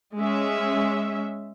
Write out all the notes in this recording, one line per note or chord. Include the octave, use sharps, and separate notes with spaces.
G#3 C#4 E5